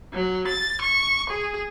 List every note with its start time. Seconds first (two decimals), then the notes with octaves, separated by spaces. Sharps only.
0.13 F#3
0.48 A6
0.82 C#6
1.30 G#4